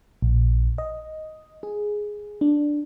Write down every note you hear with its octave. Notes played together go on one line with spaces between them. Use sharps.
A#1
D#5
G#4
D4